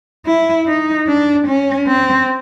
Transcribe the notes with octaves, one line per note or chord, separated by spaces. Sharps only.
E4
D#4
D4
C#4
C4